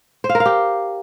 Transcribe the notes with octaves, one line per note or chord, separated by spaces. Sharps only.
C5
F5
A#4
F5
G4